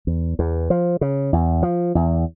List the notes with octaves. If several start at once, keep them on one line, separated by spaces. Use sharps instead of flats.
E2
E2
F3
C#3
E2
F3
E2